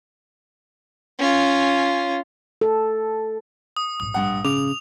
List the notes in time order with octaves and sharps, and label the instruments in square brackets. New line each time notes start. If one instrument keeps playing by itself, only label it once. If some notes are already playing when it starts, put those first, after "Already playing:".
[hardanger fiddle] C#4 F4
[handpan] A4
[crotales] D#6
[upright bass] A#1 G#2 [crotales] D#6
[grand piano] G2 F#5
[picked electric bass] C#3 [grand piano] D6 [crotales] F7